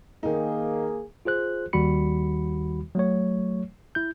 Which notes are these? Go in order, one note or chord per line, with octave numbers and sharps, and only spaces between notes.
D#3 A#3 D#4 G#4
F4 G#4 C5 F#6
D#2 D#3 G3 F#4 B5 C#7
F#3 A3 C#5
E4 G6